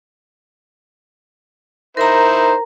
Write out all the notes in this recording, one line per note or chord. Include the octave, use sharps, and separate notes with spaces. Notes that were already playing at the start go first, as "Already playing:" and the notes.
D#4 E4 A#4 C5 A#5